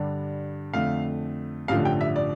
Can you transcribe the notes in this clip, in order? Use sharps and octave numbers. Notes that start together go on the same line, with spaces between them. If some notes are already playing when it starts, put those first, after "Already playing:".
Already playing: G2 D3 G3 D4
F2 D3 A3 F5
A1 G2 D3 F3 A3 F5
G5
E5
D5